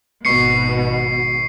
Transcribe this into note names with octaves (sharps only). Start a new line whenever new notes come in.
G#1 B2 C#6 C7 C#7